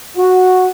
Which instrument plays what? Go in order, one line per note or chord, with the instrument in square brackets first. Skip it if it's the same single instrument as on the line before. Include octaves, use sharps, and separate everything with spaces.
[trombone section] F#4